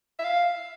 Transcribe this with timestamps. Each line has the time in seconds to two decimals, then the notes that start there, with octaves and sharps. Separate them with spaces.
0.19 E5
0.24 F5